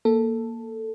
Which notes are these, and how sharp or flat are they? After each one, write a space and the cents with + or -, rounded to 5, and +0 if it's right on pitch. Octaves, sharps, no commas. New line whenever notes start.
A#3 +0 A4 +5